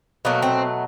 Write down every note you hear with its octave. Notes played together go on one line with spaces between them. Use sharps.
B2 F#3 A3 A#3
C4